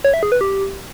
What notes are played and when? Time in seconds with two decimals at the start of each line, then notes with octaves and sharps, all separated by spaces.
0.04 C#5
0.14 E5
0.23 G#4
0.32 B4
0.41 G4